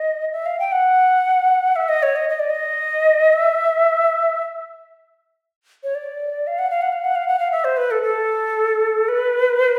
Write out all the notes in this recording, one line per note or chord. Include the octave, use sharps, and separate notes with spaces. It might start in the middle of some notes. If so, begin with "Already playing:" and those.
Already playing: D#5
E5
F5
G5
F#5
E5
D#5
C#5
D#5
D#5
D5
D#5
E5
C#5
D5
F5
F#5
F5
F#5
F5
F#5
F5
F#5
F5
E5
C5
B4
A4
A4
B4